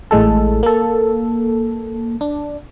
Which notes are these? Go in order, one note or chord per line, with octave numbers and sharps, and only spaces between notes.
A1 A2 G#3 A4
A#3 A4
D4